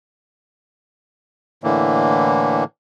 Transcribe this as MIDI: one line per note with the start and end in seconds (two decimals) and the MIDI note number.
1.64 2.64 45
1.64 2.64 50
1.64 2.64 52
1.64 2.64 58